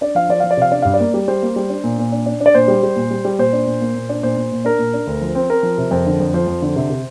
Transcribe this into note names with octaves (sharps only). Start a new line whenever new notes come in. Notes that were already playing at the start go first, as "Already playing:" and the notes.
D4 D5
F3 F5
F3 D5
F3 F5
D5
C3 F5
D4 D5
G2 F5
D5
A#3
G3
G3 C5
A#3
G3
D4
A#2
A#2
D4
D4
D4
D5
A#2 C5
G3
G3
A#2
G3
G3
A#2 C5
D4
A#2
A#3
A#2
D4
A#2 C5
A#2
A#2
D4 A#4
A#2
D4
D2
F3
C4
C4 A#4
F3
C3
F2
D3
F2
F3 C5
F2
D3
C3
C3